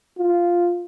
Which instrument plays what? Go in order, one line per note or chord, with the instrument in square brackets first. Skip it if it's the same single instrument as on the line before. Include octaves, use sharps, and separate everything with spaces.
[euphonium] F4